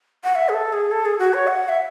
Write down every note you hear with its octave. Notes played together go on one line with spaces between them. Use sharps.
F#5
E5
G#4
A4
G#4
A4
G#4
F#4
C#5
F#5
E5